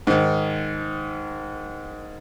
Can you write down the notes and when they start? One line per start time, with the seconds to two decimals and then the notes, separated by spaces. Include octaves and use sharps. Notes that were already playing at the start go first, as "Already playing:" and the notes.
0.07 G#2 D#3